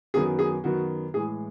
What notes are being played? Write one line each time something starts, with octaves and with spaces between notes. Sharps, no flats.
F#2 D#3 F#3 B3 G#4
G#4
F#2 D#3 F#3 B3 F#4
A2 E3 G#3 G#4